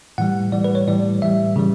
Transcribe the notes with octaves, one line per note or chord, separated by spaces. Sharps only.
A2 E3 G3 F#5
A2 E3 G3 D5
B4
C#5
A2 E3 G3 D5
A2 E3 G3 E5
C#3 E3 G3